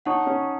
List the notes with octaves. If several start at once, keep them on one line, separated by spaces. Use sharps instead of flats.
D#4 C#5 F#5 A5 C#6
C#4